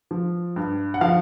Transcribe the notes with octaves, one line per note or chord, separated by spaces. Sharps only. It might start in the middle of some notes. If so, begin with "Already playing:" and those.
F3
G2
F#5
F3 F5